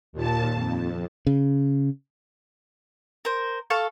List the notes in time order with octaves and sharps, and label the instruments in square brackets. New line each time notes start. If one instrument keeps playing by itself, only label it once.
[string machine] D#2 A#2 A5
F2
[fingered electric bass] C#3
[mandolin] A#4 C5
A4 F5 C#6